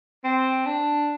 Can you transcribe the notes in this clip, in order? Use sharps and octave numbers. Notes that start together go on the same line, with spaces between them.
C4
D4